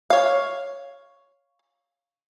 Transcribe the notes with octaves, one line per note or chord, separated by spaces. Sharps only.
C#5 F5